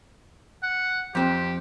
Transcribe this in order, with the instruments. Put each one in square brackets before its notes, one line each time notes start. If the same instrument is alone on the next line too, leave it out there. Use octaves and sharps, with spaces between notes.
[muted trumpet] F#5
[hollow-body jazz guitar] F2 C4 [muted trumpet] G4